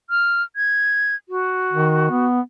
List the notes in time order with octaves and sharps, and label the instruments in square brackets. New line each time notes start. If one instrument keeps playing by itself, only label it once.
[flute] F6
G#6
F#4
[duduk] D#3
B3